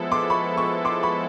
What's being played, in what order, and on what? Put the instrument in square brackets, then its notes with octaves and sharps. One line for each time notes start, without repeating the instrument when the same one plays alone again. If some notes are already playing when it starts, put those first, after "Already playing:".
Already playing: [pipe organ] F3 G#3 B3 E4 A4
[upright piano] C6 D6
B5 C#6
B5 C#6
C6 D6
B5 C#6